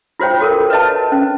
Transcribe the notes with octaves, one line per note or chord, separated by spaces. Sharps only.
F4 F#4 C5 C#5 G5
F#4 A4 A#4
B4 C#5 D#5 A5
C#4